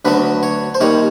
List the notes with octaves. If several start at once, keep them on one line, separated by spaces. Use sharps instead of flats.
D2 D3 F#3 B3 B4
C#5
C5
D#2 D#3 G3 C#5